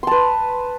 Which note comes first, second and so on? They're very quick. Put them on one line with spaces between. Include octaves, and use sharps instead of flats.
C6 A5 B4